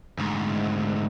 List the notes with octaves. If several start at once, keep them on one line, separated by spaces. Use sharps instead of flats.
D2 G#2